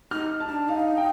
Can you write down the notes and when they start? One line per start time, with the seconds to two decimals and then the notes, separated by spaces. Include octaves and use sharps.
0.11 D#4 F6
0.40 A5
0.49 D4
0.68 D#4 F5
0.97 G5